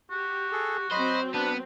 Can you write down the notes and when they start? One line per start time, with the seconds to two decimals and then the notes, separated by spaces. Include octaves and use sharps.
0.11 F#4 G4
0.52 G#4 A4
0.91 F#3 C4 C5 D#5 B5
1.34 B3 D4 B4